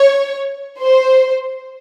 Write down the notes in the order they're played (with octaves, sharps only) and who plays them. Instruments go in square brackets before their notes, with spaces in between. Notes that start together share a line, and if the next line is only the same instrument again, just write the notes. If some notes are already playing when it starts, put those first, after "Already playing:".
Already playing: [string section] C#5
C5